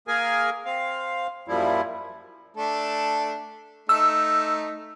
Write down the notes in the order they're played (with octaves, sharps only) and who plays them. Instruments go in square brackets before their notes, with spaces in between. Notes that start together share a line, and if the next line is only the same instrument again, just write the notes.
[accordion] A#3 G#4 A#4 G#5
C4 F5
F#2 A#2 F3 G3 E4
[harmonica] A3 D4 A4
[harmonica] A3 D#4 [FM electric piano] E6